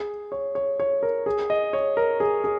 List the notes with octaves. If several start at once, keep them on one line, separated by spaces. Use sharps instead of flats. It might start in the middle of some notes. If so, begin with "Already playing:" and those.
Already playing: G#4
C#5
C#5
C#5
A#4
G#4
D#5
C#5
A#4
G#4
G#4